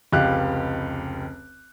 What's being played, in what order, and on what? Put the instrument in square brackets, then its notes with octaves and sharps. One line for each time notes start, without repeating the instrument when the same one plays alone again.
[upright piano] F1 C#2 G4 F5 F#6